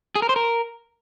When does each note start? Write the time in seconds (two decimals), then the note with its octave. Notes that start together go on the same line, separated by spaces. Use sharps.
0.16 G#4
0.22 A#4
0.29 C5
0.36 A#4